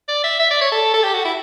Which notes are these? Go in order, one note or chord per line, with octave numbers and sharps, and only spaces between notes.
D5
E5
E5
D5
C#5
A4
A4
G4
F#4
E4